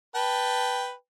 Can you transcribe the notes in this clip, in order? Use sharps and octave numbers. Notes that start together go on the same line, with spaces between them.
B4 G5 A5